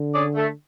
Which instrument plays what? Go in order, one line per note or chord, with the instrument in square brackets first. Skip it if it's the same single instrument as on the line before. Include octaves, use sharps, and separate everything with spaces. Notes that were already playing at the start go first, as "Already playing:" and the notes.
Already playing: [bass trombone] D3
[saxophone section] C#4 G#4 D5
A3